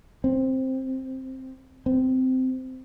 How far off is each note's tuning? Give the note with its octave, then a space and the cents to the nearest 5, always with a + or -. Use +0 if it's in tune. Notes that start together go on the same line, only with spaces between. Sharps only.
C4 +5
C4 -15